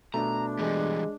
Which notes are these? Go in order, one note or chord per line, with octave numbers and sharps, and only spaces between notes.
B2 A3 D4 A#5
E3 G3 G#3